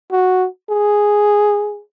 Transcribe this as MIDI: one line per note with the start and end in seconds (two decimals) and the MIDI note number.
0.11 0.46 66
0.70 1.81 68